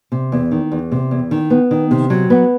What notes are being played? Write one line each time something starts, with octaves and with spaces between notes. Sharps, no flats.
C3
E2
D#3
E2
C3
E2
D#3
B3
D#3
C3
F#3
B3